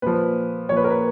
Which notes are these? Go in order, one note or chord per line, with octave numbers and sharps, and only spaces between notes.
A#2 F3 B4
A#2 F3 C#5
B4
A#4
B4